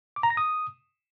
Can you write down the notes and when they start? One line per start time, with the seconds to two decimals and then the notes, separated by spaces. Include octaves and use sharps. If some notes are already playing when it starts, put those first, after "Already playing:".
0.16 D6
0.23 A#5
0.30 A#6
0.37 D#6